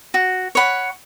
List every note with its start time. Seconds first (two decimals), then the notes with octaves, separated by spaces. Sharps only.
0.14 F#4
0.55 C#5 F#5 B5